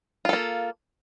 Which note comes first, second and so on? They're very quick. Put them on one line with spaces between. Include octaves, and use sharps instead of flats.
F4 A4 A#3